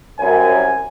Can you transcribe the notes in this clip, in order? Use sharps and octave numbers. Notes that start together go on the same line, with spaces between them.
C2 F#2 G#5